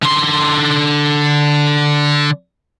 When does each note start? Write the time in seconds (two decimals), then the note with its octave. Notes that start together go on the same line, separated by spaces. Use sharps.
0.03 D3 C6